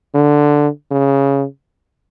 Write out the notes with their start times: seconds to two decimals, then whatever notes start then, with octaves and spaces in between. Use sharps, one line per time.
0.14 D3
0.91 C#3